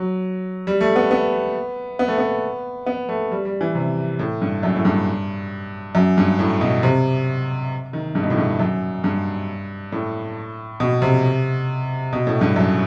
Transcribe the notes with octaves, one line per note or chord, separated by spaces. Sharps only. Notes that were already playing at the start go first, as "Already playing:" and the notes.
Already playing: F#3
G3
A3
B3
B3
B3
A3
B3
B3
A3
G3
G3
E3
C3
A2
G2
F#2
A2
G2
F#2
G2
A2
B2
C3
D#3
G2
B2
A2
G2
F#2
G2
A2
B2
C3
B2
A2
G2
F#2